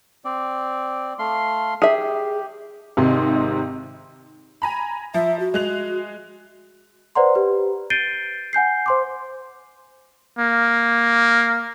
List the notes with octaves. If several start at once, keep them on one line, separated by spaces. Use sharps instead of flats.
C4 D5
A3 F5 C6
G4 G#4 E5
G#1 G#2 C3 D#4 C6
G#5 A#5 B5
F3 E5
F#4
G#3 F#6 F7
B4 C5 D5 F#5 A#5 C6
G4 B4
G6 A6 C7 D7 D#7 G7
F#5 G#5 G6 C7
C5 C6 D6
A#3